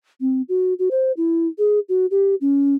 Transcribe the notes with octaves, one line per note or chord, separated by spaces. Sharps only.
C4
F#4
F#4
C5
E4
G#4
F#4
G4
C#4